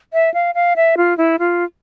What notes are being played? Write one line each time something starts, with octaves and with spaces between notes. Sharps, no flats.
E5
F5
F5
E5
F4
E4
F4